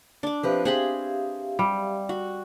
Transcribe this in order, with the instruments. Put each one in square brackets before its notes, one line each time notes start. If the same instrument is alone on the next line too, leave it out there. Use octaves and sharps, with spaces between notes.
[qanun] D4 D6
[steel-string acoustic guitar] F3 C4 B4 [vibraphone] G4 E5 F5
[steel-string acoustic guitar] C4 [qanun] G#4 B5 C6
[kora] G3
[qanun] F#4